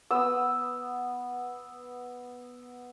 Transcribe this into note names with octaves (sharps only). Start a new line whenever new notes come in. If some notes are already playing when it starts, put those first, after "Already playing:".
B3 E6